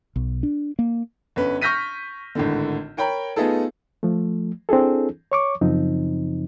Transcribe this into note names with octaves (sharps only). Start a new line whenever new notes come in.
B1
D4
A#3
G1 C#4 B4
C#6 F6 G6 A#6 B6 D#7
G#1 A2 D3
A#4 C#5 G5 A#5 B5
A3 B3 D#4 F4 G#4 A4
F3 A3
C4 D4 E4 G#4 A4
C#5 C#6 D6
F#2 C#3 F3 C4 D#4